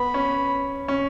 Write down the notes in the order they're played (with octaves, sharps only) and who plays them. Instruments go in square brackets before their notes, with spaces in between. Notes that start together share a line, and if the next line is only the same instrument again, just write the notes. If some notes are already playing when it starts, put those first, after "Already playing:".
Already playing: [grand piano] B3 [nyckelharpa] B5
[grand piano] C#4
C#4